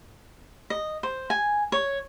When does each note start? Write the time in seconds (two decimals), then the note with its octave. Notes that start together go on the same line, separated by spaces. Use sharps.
0.70 D#5
1.03 C5
1.30 G#5
1.72 C#5